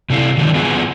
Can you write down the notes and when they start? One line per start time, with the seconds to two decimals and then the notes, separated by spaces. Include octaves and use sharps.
0.10 C3 C4 D4 E4 A4 F5
0.38 D#3 F#3 G#3 C#4 D4 E4
0.55 B3 F4 G#4 B4 E5 G#5